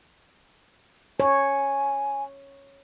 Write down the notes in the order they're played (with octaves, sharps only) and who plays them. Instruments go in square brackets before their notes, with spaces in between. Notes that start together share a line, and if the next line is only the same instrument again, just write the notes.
[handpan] C#5 [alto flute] G#5